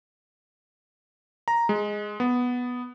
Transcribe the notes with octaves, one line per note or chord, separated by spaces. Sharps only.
A#5
G#3
B3